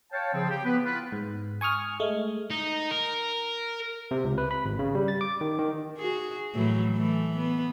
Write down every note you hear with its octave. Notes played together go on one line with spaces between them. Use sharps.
C#5 F5 G5 A5
C#3 F3 C4
G4
B3 B4
B3 E4 F4 B4
G#2
G#5 C#6 D#6 F6
G#3 A3
D#4
A#4
C3
C#2
B4
B5
G#1
C#3
G3
A6
D6
D#3
D#3
F#4 G#4
A2 E3 F#3
E3 A3
B3